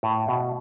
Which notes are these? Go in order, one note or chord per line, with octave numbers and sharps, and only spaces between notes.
A2
B2